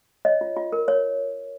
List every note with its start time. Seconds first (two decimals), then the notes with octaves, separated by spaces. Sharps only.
0.25 C#5 D#5
0.41 F4
0.56 F4
0.72 A#4
0.88 C#5